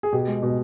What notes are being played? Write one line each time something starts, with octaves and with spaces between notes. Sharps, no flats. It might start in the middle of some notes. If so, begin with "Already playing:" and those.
G#4
B2 G4
G#3
B2